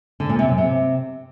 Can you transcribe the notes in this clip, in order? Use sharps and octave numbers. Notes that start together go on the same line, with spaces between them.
D3
A#2
C3
F#2
C3